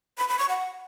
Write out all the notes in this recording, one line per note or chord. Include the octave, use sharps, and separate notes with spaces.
B5
B5
C#6
F#5